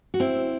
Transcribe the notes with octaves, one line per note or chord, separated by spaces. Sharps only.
F#4
C4 E4